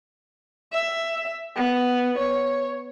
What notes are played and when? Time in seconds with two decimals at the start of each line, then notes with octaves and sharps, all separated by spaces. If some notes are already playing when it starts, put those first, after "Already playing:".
0.73 E5
1.56 B3
2.18 C#5